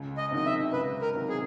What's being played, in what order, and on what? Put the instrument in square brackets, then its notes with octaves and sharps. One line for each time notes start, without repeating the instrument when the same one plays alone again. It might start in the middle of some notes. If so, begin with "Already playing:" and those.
Already playing: [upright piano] C#2
[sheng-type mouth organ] D#5
[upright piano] C3 D#3 F#3 [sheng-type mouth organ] D#5
[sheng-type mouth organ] E5
[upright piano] C#2 [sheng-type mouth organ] B4
[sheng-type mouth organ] A#4
[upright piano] C3 D#3 F#3
[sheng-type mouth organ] G#4